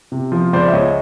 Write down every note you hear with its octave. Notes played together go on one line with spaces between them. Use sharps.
C3
F3
C#2 C5 D5
E5
C#2 C#5 D#5